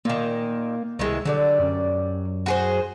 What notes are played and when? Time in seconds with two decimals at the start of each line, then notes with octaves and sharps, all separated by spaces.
0.05 A#2 D#3 A#3
0.99 C2 D#3 E3 G#3
1.25 D3 F#3 G3 D5
1.60 F#2
2.46 F#4 G#4 C5